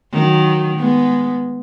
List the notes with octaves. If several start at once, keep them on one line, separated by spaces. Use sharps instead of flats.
D#3 F#3
G#3 B3